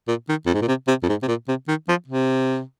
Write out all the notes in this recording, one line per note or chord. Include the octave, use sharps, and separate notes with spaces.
A#2
D#3
F2
G#2
A#2
C3
C3
F2
G#2
C3
A#2
C3
D#3
F3
C3